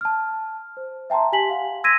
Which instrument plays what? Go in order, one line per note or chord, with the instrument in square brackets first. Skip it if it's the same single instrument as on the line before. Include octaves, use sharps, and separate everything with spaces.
[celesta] A5 F6
C5
E5 G5 A5 A#5 C6
G4 G#5 A5 B6 F#7
F5 F#5
C6 E6 G#6 A#6 B6 D#7